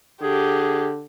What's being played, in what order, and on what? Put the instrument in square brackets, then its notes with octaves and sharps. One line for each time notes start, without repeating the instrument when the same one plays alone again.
[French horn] D3 [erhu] G4 [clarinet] G#4